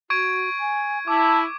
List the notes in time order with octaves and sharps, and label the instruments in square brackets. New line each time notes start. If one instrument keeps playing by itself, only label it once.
[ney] F#4 [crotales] C#6 G#6 D7
[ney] G#5
[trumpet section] E4 [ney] A5 [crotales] D6